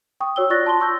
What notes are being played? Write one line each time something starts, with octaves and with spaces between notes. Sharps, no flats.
G5 C#6 D#6
F#4 C#5 E6 G7
F4 D5 C#6 F#6 A6 A#6
F4 A5 C6 G7
C#6 E6 G6 A#6